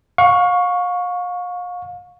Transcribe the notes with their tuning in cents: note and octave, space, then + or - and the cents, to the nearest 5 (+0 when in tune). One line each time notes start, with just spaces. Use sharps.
F5 +35 C#6 +0